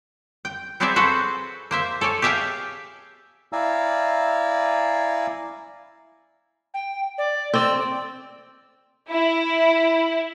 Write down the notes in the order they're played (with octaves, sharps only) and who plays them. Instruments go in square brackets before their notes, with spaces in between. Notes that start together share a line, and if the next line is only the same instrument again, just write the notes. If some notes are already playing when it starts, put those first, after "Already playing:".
[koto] G5
B3 C4 G#4 C5 D5 E5
F#4 G#4 A4 B4 C5
A#3 C5 E5
A4 C#5 D5 G#5
G4 G#4 E5 F5 G5 A5
[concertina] E4 D5 F5 G#5 A#5 E6
[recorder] G5
D5
[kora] C4 D5 [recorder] E6
[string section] E4